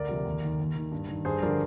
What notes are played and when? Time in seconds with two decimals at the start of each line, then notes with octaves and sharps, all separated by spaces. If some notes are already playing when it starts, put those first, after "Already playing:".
Already playing: D2 A#4 D5
0.09 C3 F3
0.25 D#2
0.42 D#3
0.60 D#2
0.76 D#3
0.92 G2
1.09 D#3
1.25 G2 G#4 C5
1.42 D3 F3 A#4 D5